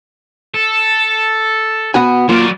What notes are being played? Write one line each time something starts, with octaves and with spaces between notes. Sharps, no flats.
A4
B3 F#4 G#5
F#3 A#3 F4 D5